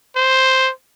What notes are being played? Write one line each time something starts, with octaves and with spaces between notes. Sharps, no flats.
C5